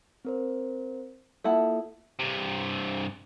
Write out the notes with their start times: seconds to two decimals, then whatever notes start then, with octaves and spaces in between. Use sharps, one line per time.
0.25 C4 A#4 C5
1.44 A#3 E4 F4 A4 F#5 A5
2.19 G2 C3